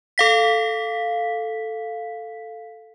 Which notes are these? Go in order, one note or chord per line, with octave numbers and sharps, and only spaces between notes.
A4 F5 B6